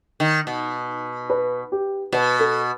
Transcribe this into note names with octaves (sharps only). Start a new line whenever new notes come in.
D#3
B2
B4
G4
B2 B4
A4